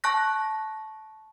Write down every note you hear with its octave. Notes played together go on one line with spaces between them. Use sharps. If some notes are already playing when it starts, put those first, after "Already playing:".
A5 C#6 F#6 A#6